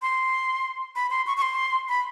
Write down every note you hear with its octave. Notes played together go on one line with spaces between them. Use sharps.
C6
B5
C6
C#6
C#6
C6
B5